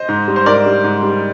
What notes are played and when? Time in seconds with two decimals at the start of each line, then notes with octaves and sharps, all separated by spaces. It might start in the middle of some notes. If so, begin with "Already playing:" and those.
Already playing: C5 D#5
0.09 G#2
0.28 G3
0.36 C5
0.46 G#2 A#4 D5
0.66 G3
0.84 G#2
1.03 G3